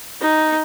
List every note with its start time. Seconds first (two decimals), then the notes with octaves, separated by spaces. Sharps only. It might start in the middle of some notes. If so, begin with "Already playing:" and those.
0.22 D#4